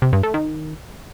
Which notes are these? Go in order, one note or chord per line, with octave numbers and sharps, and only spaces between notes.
C3
G2
A3
D#3